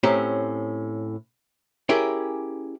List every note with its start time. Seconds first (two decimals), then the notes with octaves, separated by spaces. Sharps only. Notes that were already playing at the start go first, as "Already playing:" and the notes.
0.03 A2 C4 C#4 G4 A#5
1.89 C#4 E4 G4 G#4 A#4